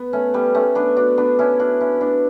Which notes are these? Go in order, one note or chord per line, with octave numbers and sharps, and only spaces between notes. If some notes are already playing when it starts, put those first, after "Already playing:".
Already playing: B3
A3 C#4
G3 B3
A3 C#4
B3 D4
D4 F#4
B3 D4
C#4 E4
D4 F#4
C#4 E4
B3 D4